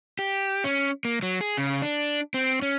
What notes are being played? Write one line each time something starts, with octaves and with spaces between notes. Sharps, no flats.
G4
C#4
A#3
F#3
G#4
C#3
D4
C4
C#4